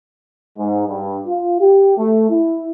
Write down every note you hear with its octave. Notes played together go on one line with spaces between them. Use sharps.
G#2
G2
F4
G4
A3
E4